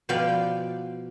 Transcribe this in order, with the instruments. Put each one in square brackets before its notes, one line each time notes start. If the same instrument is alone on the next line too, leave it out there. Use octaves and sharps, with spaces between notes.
[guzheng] B2 F3 B3 D5 F5 G5